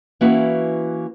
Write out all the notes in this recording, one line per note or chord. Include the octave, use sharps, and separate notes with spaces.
E3 A#3 C#4 E4 F#4 B4